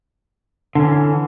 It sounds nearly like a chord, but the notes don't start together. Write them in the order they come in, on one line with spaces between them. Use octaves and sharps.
D3 C#4 E3